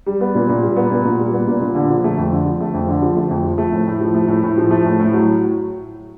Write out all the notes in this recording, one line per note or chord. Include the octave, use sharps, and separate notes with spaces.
G3
B3
A#2
A#2
G3
B3
A#2
A#2
G3
B3
A#2
A#2
D3
F3
A3
F2
D3
F3
A3
F2
D3
F3
A3
F2
F3
A3
A2
A2
F3
A3
A2
A2
F3
A3
A2
A2
F#3